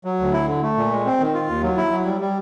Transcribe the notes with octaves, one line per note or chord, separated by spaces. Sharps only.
F#3
D2
E4
D3
A3
A#2
G#3
C4
D#3
F4
D#2
F#3
E4
F#3
G3
G3